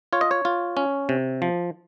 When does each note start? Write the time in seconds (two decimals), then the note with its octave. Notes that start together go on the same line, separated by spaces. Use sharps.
0.13 F4 C#5
0.21 D#5
0.31 C#5
0.45 F4
0.77 C#4
1.09 C3
1.42 F3